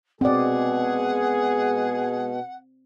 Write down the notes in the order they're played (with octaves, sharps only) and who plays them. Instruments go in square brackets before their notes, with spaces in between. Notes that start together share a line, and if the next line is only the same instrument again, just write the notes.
[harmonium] B2 [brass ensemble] G#3 G#4 [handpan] C4 D5 [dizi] F#5